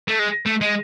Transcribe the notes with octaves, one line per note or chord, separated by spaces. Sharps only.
A3
G#3
A3
G#3